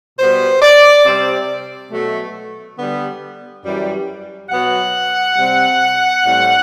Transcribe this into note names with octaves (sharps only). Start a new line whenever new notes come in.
B2 G3 B3 C5
D5
C3 G3 C4
B2 F#3 A3
D3 G3 B3
F#2 E3 G3
B2 F#3 B3 F#5
C3 G3 C4
A2 G3 C4